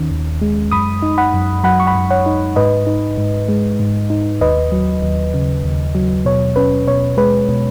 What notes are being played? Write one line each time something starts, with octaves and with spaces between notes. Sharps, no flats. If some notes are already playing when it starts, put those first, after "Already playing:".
Already playing: D#2 D#3 C#4
D#2
G#3
F#2 B5 D#6
D#4
F#5 B5
F#2
F#3 F#5 B5
C#6
F#5 B5
F#2
C#5 F#5
D#4
G#2 B4 D#5
D#4
G#2
G#3
G#2
D#4
D#2 B4 D#5
F#3
D#2
C#3
D#2
F#3
B2 C#5
C#4 B4
B2 C#5
G#3 B4
B2